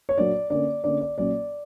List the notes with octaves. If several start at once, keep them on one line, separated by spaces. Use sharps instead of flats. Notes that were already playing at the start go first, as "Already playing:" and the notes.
C#5
A#2 F#3 A#3 D4 D5
D3 A#3 C#4 D5
D3 A#3 C#4 D5
D5
A#2 F#3 C#4 D5